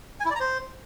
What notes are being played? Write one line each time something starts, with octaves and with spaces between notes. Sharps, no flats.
G#5
E4
D5
A#5
C5